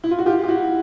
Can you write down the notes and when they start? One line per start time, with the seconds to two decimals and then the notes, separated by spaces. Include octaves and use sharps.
0.04 E4
0.11 F4
0.19 F#4
0.26 F4 G4
0.44 G4
0.48 E4 F#4